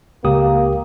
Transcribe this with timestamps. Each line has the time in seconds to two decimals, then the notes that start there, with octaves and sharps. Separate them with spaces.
0.24 C#2 A#3 G4 D#6